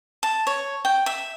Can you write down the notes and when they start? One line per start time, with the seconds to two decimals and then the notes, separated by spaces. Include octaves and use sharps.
0.23 A5
0.47 C#5
0.85 G5
1.06 E5